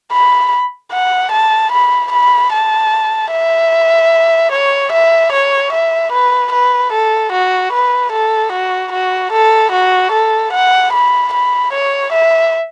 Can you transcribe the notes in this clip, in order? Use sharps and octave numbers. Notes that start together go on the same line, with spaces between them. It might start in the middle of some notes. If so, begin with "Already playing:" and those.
B5
F#5
A5
B5
B5
A5
E5
C#5
E5
C#5
E5
B4
B4
A4
F#4
B4
A4
F#4
F#4
A4
F#4
A4
F#5
B5
B5
C#5
E5